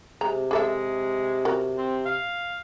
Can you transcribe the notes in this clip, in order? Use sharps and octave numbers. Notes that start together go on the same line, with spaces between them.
C3 G#3 C4 A#5
G#3 G#4 A4 E5
F#4 A#4
C4
F5